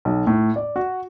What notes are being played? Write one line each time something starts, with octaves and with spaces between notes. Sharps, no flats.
B1
A2
D5
F#4